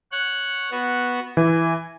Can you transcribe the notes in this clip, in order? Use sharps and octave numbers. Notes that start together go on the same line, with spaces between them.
C#5 F#5 F#6
B3 F#4
E3 G#5